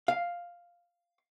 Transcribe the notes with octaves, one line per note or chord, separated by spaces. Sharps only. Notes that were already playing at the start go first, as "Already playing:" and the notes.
F5